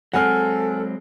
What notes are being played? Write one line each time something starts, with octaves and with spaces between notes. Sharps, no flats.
F#3 G#3 C4 A4 F#5 G#5 F6